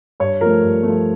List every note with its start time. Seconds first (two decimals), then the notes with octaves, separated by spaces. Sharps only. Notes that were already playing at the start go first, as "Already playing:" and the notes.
0.20 G2 C#5
0.41 F3 A3 A#4
0.62 G2
0.83 F3 A3